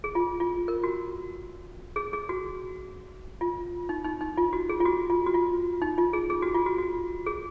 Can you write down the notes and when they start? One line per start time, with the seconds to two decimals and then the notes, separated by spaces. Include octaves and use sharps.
0.04 G#4
0.15 F4
0.40 F4
0.68 A#4
0.84 F#4
1.96 G#4
2.13 G#4
2.29 F#4
3.41 F4
3.89 D#4
4.05 D#4
4.21 D#4
4.38 F4
4.53 F#4
4.69 G#4
4.80 F4
4.86 F#4
5.10 F4
5.27 F#4
5.34 F4
5.82 D#4
5.98 F4
6.13 G#4
6.30 G#4
6.42 F#4
6.55 F4
6.66 F#4
6.78 F#4
7.26 G#4